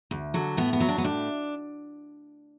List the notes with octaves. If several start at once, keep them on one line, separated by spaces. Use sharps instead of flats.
D2
D3 F#3
A2 B3
B3
F#3
D4
B3
A2 D4